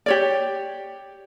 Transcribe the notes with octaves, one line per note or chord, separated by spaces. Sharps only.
G4 C#5 D5